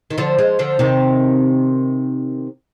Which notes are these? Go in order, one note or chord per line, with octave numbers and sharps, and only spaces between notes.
D#3
D3 F3
F3 G#3
D3 F3
C3 D#3